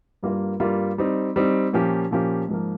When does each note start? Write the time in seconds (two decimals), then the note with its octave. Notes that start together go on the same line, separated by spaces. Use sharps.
0.23 G2 G3 A#3 F4 A#4
0.60 G2 G3 A#3 F4 A#4
0.98 G3 C4 D#4
1.36 G3 C4 D#4
1.73 A#2 F3 A#3 C#4 G4
2.11 A#2 F3 A#3 C#4 G4
2.49 G#2 F3 A#3